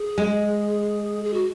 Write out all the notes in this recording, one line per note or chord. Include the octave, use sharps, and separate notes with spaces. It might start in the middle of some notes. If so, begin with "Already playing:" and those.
Already playing: G#4
G#3
G#4
F#4